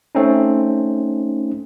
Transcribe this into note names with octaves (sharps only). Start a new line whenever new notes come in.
A3 C4 C#4 D#4